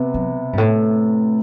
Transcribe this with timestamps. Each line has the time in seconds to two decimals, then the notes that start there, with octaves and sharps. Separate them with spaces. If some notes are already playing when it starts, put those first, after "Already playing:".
Already playing: C3 B3
0.14 F#3
0.36 B2
0.53 G2
0.58 A2